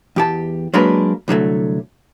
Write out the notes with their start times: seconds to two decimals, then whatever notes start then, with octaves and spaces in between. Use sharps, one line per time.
0.16 E2 G4 A5
0.74 F#3 G#3 A#3 D4 A#4 B4
1.28 C2 D3 F#3 A3